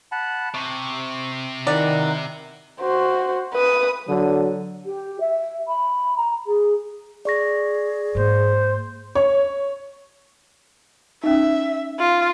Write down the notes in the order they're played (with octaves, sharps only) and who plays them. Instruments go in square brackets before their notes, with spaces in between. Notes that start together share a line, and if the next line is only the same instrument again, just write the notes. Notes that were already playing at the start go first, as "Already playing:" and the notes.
[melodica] F#5 A5 B5
[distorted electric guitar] C3 [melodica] C#6
[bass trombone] D#3 [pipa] E3 D5 [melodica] F#5 A#5
[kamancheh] F#4 C5
B4 D#6
[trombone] D3 [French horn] F#3
[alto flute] G4
E5
B5
A#5
G#4
[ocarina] G#4 [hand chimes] D5 C#6 A#6
[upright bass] G#2 A#3 [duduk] C5
[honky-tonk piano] C#5
[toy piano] C#4 D#4 [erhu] E5
[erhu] F4